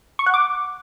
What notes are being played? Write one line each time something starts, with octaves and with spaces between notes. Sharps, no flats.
C#6
F#5
D6